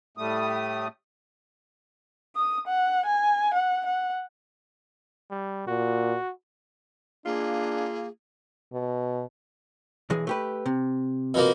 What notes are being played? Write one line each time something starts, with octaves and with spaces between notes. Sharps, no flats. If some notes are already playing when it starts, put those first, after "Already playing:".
A2 G3 A3 D#6
D#6
F#5
G#5
F#5
F#5
G3
A#2 F#4
A#3 D4 F4 G#4
B2
B1 E3 G#3
A3 G4 B4
C3
B2 F3 A#3